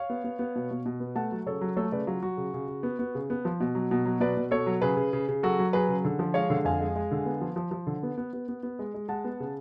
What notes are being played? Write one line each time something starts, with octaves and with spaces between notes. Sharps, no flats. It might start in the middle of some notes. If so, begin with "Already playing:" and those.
Already playing: C#5 F5
B3
B3
B3
B2
B2
B2
B3
A3 F#5 A5
F#3
C#3 A4 C#5
F#3
A3 A4 C#5
C#3 B4 D5
F#3 F4
F#3 F#4
C#3
C#3
C#3
B3
B3
C#3
B3
F3
B2
F#3
B2
F#3
B2 B4 D5
B2
B2 A4 C#5
F#3
C#3 G#4 B4
C#3
C#3
C#3
F#3 F#4 A4
F#3
F#3 G#4 B4
C#3
D3
F3
G#3 C#5 F5
D3
F2 F5 G#5
G#3
G#3
D3
B3
F3
F3
F3
D3
B3
B3
B3
B3
B3
G#3
G#3
G#3 F#5 A5
B3
C#3